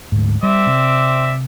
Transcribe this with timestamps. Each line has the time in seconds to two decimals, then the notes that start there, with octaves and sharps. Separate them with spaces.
0.12 D2 G#2
0.43 G3 C4 D5 E5
0.67 C3